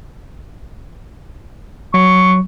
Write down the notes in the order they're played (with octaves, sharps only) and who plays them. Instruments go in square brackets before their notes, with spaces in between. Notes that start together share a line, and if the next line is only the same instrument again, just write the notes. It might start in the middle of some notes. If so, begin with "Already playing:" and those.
[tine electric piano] F#3 [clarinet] C#6